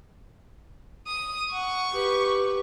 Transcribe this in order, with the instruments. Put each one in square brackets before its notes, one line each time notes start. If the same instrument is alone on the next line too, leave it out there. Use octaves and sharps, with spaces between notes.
[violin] D#6
[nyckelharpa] F#5 [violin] C#6
[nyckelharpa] G4 B4